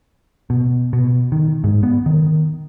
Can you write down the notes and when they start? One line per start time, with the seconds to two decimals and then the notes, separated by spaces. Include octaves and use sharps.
0.50 B2
0.93 B2
1.32 D#3
1.64 G#2
1.83 B3
2.06 D#3